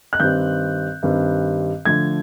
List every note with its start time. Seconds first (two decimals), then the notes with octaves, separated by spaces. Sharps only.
0.13 F#6
0.19 G2 D#3 G3 C4 G6
1.03 G2 D#3 G3 C4
1.85 D3 F3 A3 G#6